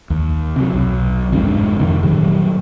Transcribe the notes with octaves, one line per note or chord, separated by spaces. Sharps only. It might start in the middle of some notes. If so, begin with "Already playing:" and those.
D#2
C3 F#3
B1
G1 F2 G#2 D4
F1 F2 D#3
A#2 D#3 F#3 G3